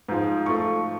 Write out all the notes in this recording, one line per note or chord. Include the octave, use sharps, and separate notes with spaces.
G#2 F3 G#3
F3 A3 C#6